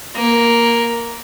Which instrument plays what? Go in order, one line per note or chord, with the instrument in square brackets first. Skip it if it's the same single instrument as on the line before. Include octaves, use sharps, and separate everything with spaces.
[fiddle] A#3